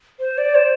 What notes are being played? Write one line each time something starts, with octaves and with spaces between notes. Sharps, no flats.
C5
D5
C5